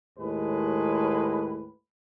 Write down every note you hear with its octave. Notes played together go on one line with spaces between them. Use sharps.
D#2 A2 G#3 B4